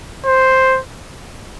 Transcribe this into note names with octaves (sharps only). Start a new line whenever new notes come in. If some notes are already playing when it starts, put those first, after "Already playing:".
C5